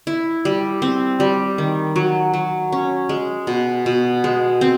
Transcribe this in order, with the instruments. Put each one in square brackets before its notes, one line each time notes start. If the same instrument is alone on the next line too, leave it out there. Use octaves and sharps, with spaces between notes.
[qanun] E4
G3
C4
G3
D#3
F#3
F#3
C#4
G#3
B2
B2
G#3
C4